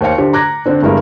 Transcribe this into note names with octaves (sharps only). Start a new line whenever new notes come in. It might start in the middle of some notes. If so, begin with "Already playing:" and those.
D#2 C5 C#5 F5 C#7
D3 G4 C5
A#5 D6 F#6 G#6 A#6
D3 C4 D4
G1 G2 G#3 E4 A#4